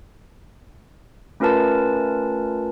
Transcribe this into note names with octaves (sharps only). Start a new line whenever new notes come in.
A3 C#4 F4 A#4 B4 A5